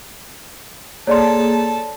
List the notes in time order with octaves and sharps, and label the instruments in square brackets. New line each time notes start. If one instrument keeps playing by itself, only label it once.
[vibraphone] A#3 G#4 [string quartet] A4 A5 [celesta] C#5 D5 C6